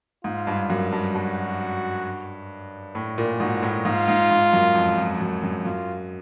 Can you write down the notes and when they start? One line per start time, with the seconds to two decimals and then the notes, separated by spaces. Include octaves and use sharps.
0.24 G#2 F4
0.47 G2
0.70 F#2
0.92 G2
1.15 G2 F#4
2.95 A2
3.18 A#2
3.40 G#2 F#4
3.63 A2
3.85 G#2 F4
4.08 G#2
4.31 G#2
4.53 F#2
4.75 F2
4.98 F2
5.21 F#2
5.43 F#2
5.65 F#2 F4